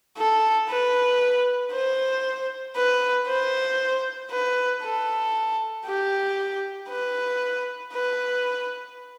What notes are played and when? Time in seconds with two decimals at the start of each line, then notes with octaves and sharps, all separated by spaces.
0.18 A4
0.69 B4
1.73 C5
2.76 B4
3.28 C5
4.31 B4
4.83 A4
5.86 G4
6.90 B4
7.93 B4